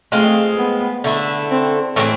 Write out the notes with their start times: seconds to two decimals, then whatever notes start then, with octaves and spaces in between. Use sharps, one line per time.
0.12 G#3 A3 C4 F4
0.57 B3
1.04 D3 A3 E4
1.49 C4
1.96 A2 E3 A3 C4